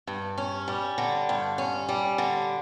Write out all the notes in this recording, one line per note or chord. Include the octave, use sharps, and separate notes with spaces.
G2
C#4
G3
D3
G2
C#4
G3
D3